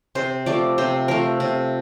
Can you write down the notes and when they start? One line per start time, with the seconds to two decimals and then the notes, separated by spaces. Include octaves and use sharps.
0.15 C3 C5
0.46 F3 A3 D5
0.78 C3 C5
1.08 F3 A3 A#4
1.40 C3